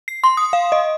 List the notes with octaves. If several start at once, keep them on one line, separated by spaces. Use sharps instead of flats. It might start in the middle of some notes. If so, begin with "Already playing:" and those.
C7
C6
D#6
F5
D#5